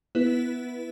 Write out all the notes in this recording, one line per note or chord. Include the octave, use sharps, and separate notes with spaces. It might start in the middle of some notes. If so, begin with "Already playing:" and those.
B3 E4 B4